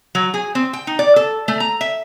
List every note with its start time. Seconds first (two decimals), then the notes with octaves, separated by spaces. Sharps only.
0.15 F#3
0.34 G#4
0.55 C4
0.73 G5
0.87 D#4
0.99 D5
1.16 A4
1.48 A3
1.60 A#5
1.81 E5